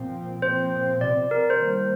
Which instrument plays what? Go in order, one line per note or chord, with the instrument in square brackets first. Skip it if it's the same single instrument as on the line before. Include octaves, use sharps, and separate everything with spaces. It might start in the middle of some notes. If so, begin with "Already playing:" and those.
Already playing: [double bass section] A#2 F3 C4
[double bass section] A#2 F3 C4 [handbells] C5
[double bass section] C3 F3 C4 [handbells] D5
[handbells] A#4
C5
[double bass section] D#3 G3 A#3